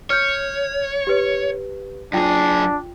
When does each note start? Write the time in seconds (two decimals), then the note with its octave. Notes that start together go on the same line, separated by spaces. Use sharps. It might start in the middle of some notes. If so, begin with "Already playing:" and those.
0.10 C#5 F6 G6
1.07 G4 B4
2.13 F#2 D4 F4 G#4 G5